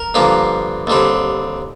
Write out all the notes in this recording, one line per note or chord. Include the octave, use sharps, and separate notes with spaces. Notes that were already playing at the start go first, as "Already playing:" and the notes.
Already playing: A#4
G2 D3 F3 A#3
D#2 D3 G3 C4